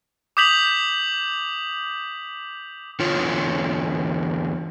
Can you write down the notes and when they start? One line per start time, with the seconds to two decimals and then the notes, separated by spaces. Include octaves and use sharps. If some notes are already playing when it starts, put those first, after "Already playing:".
0.37 D6 D#6 G6 B6 F7 F#7
2.99 E2 D3 F4 C#5